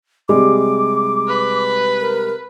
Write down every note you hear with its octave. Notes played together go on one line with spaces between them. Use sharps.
C3 G3 G#3 D6
B4
A#4